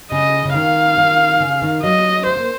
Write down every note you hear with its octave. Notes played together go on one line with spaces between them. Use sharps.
C#3 D#5
C#3
D#3 F5
D#3
C#3
D#3
F#3 D#5
A3 C5
A#3